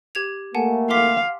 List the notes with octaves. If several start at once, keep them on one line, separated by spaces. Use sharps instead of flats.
G4 G#6 F7
A3 A#3 F#5 G#5 A5
F5 C6 D6 B6